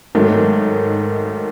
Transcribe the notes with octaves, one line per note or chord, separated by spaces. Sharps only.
G#2 D#3 F#3 A3